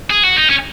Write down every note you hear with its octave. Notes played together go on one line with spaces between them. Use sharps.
G#4
F#4
D#4
C#4